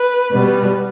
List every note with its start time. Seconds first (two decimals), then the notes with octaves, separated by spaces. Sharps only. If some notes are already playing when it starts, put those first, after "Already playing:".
Already playing: B4
0.32 B2 G3 B3